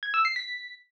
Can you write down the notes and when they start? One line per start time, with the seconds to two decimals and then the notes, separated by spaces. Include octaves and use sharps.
0.03 G#6
0.14 E6
0.25 C7
0.36 B6